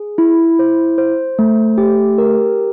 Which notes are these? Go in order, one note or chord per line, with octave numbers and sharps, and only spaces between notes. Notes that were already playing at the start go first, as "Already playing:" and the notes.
Already playing: G#4
E4
C5
C5
A3
G4
A#4